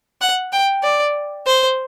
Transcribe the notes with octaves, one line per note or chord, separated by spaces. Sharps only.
F#5
G5
D5
C5